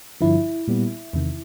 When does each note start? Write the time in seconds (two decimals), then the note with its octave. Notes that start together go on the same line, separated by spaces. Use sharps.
0.21 G2 D3 F3 E4
0.68 A#2 G3 B3
1.13 E2 C3 D#3